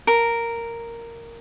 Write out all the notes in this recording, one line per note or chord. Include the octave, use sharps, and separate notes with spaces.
A#4